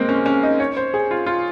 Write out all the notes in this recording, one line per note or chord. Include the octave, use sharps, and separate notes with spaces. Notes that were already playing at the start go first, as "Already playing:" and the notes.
Already playing: G#3 A#3 C4
C#4
C#4
D#4
C#5
C5
G#4
F4
F4